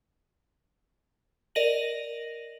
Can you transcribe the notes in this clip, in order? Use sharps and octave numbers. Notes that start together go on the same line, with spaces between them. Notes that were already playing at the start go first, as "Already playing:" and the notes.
A#4 D5 D#5 A#6 D#7 F#7